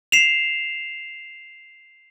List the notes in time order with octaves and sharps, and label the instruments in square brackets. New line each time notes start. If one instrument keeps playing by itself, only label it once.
[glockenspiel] C7 E7 F7